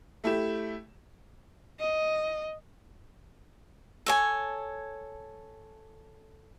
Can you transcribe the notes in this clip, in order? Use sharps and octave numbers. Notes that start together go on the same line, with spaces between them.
A3 E4 G4 E7
D#5
A4 C#5 G#5